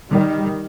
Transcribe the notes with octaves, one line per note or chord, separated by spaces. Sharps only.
D#3 G3